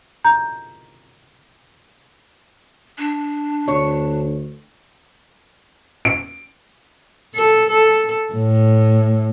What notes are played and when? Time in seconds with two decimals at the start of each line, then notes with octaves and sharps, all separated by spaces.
0.24 A#5 G6
2.98 D4
3.68 D2 C#5
6.05 D7
7.35 A4
7.70 A4
8.33 A2